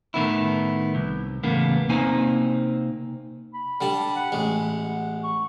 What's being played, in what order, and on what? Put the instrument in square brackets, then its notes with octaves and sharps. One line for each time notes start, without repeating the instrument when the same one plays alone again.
[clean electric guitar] A2 D#3 B3 E4
C2
E2 A2 C#3 A#3 B3
C3 A#3 C4 D#4 G#5
[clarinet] B5
[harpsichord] D3 G3 A5
[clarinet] F#5
[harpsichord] A1 G#3
[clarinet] C#6